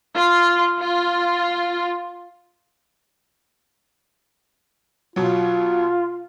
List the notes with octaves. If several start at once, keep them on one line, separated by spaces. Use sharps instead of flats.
F4
F4
B2 F#3 F4